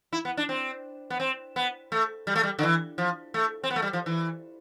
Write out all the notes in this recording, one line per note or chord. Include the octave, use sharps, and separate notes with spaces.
E4
B3
D4
C4
B3
C4
B3
A3
G3
A3
G3
D3
E3
F3
A3
C4
B3
A3
G3
F3
E3